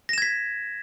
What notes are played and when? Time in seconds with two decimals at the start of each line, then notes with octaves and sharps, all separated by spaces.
0.09 A#6
0.13 E7
0.18 G#6
0.22 B6